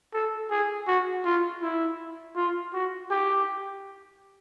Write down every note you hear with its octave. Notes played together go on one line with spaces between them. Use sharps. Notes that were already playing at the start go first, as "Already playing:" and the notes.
A4
G#4
F#4
F4
E4
F4
F#4
G4